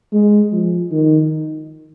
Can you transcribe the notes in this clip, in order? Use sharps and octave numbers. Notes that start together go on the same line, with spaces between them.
G#3
F3
D#3